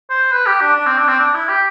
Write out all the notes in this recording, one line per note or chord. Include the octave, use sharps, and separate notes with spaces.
C5
B4
G4
D4
D4
C4
D4
C4
D4
E4
G4